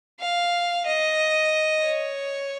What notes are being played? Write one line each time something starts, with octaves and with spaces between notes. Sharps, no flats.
F5
D#5
C#5